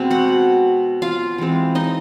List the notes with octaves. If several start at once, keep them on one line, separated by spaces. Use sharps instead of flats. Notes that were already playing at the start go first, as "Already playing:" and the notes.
Already playing: B2 G#3 C4
F#4 F#5
F4 F5
E3 G#3 C4
D#4 D#5